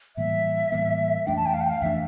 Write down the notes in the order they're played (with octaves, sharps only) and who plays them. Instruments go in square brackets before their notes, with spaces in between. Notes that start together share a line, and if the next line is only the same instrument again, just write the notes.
[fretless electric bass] A2 E3 G3 A#3 [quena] E5
[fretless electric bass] A2 E3 G3 A#3
[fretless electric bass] F2 E3 A3 D4 [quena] G5
[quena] A5
G5
F5
G5
F5
[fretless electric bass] F2 E3 A3 D4 [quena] E5